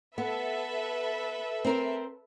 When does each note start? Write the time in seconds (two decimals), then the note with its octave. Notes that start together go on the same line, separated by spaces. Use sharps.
0.18 B3 A4 B4 E5
1.65 C4 A#4 C5